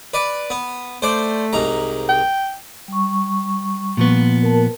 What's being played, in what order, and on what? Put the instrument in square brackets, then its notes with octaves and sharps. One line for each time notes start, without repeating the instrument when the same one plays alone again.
[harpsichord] B4 D5
B3
[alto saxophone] A3 [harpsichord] C5 D5
[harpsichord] C2 G#2 A#5
[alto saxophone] G5
[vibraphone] G3 C#6
[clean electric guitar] A#2 F3 B3
[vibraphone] A#4 A5